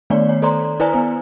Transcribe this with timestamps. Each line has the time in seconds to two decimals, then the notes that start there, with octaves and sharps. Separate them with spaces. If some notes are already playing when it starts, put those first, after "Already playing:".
0.10 D#3 A3 B3 D4 C#5 D5
0.29 C#5
0.42 A4 C5 D5 A#5 C6
0.80 E4 B4 C5 D5 G#5 A#5
0.93 B3 C5